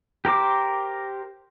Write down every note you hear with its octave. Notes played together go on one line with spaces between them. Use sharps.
G4 A#4 C5 D6